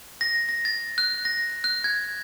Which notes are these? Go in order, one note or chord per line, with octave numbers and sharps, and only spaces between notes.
A#6
A#6
A6
F#6
A#6
F#6
G#6